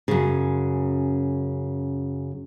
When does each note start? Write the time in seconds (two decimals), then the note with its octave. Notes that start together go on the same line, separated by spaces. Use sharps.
0.08 F#2 C#3